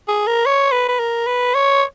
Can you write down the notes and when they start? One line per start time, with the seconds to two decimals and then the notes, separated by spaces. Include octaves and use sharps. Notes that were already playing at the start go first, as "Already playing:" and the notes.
0.08 G#4
0.27 A#4
0.46 C#5
0.72 B4
0.88 B4
0.99 A#4
1.27 B4
1.54 C#5